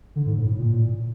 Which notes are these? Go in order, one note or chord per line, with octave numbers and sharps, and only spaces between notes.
D3
G#2
A2
A2
A#2